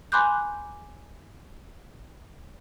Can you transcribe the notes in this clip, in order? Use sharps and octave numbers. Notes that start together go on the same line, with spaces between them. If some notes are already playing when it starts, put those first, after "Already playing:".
G#5 B5 C6 D6 F#6 G6